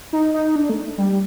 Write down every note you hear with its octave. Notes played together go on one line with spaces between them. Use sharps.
D#4
D#4
D4
A3
G3